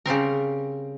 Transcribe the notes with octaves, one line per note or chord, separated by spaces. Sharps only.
C#3 G3 C4 A#4